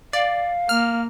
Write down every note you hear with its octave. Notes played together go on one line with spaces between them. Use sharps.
D5 F5
A#3 F6